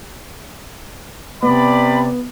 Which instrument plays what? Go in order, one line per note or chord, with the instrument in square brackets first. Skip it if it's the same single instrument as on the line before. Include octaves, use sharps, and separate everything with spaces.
[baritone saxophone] C3 [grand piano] B3 [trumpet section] D5 B5